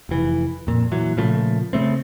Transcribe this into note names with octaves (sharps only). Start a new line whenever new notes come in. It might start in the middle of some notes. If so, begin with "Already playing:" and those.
F1 E3
F2 A#2
A#2 E3 F#3
A#2 C#3 F3 A3
C#3 A3 C4